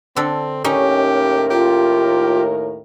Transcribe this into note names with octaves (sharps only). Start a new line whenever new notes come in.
D3 C4 A4
D#2 A2 C#4 D#4 G4 A#4
F4 G4